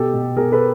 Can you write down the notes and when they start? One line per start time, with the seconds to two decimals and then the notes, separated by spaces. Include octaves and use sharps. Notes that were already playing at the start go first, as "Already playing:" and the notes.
Already playing: B2 G4 A4
0.14 B2
0.36 B2 G#4 A#4
0.52 A4 B4